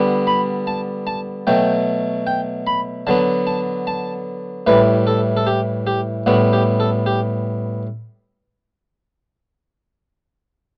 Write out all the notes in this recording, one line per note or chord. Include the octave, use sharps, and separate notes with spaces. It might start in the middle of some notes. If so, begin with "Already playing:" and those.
Already playing: D3 G3 B3
B5
A5
A5
B2 F#3 A3 G5
G5
B5
D3 F#3 B3 A5
A5
A5
A2 E3 G3 B4
A4
A4
G4
G4
A2 G3 B3 F#4
G4
A4
G4